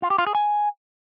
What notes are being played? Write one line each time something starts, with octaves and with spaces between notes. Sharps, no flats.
F4
G4
F4
G#4
G#5